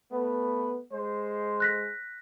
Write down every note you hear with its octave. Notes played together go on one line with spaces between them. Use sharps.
A3 B3
G#3 C5
F#6 A#6 B6